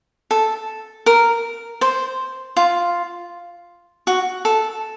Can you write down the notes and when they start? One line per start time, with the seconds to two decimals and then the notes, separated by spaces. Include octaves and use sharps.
0.31 A4
1.06 A#4
1.81 C5
2.57 F4
4.07 F#4
4.45 A4